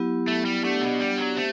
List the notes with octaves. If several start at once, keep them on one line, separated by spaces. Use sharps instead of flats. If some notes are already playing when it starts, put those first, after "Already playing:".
Already playing: F#3 B3 E4 G4
A3
G3
A3 B3 D4 G4 D5 F#5
B2
G3
F#3
A3 C4 G4 C5